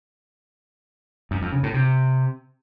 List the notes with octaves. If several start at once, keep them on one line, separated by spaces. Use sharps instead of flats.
F#2
F2
C#3
A2
C3